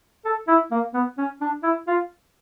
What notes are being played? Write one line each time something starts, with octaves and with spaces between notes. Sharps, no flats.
A4
E4
A#3
B3
C#4
D4
E4
F4